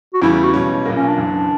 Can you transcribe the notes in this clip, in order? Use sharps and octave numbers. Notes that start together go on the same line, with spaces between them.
F#4
E2 C#3 E3 G3 E4
E4
F#4
B1 B2 G3 C#4
B1 A#2 F#3 A#3
C#4
D4
F#1 F#2 E3